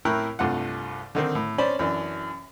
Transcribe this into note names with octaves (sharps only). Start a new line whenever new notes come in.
A2 E4 A#4 G5 C#6 F#6
C2 G2 A3 F4 F#5
D3 D#3 C4
A2
C#4 D4 C5 D5 B5
F#2 E3 D4